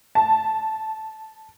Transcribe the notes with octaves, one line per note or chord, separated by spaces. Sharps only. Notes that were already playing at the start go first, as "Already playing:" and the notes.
A5